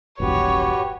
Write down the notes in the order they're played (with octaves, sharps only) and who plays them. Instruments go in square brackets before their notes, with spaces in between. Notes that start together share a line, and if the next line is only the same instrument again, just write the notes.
[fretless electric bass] D#1 A1 F#2 [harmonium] F#4 G4 B4 [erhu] C#5